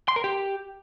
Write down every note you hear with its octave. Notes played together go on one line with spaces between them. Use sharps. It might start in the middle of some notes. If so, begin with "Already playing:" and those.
C6
A#4
G4